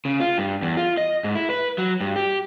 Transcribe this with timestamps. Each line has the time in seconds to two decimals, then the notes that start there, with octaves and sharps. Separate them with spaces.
0.05 C#3
0.20 F4
0.38 G2
0.62 E2
0.77 F4
0.98 D#5
1.24 G#2
1.35 E4
1.50 B4
1.78 F#3
2.01 G2
2.16 G4